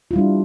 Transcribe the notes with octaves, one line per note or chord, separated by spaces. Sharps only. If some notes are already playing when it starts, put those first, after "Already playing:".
G3 D4 E4 F4